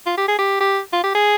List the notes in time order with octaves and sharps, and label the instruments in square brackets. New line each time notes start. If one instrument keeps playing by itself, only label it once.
[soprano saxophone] F4
G4
G#4
G4
G4
F4
G4
G#4